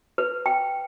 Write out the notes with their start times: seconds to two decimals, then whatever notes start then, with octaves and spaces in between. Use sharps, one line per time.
0.18 B4
0.46 G5